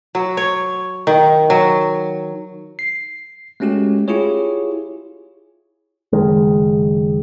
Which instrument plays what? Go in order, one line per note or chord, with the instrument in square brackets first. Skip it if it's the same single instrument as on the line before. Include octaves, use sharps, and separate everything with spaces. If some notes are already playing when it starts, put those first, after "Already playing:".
[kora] F#3
C#5
D#3
F#3
[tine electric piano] C7
G#3 A3 C#4 F#4 G4
E4 F4 G4 G#4 C#5
[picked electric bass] F#1 D#2 D#3 G#3